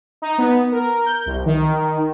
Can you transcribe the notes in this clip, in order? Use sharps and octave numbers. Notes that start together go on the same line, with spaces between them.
D#4
B3
A#4
G6
C2
D#3